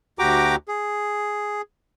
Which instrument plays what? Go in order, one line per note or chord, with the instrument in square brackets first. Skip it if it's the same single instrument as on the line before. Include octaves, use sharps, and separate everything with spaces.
[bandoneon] D2 F#4 G4 G5 A#5 D6
G#4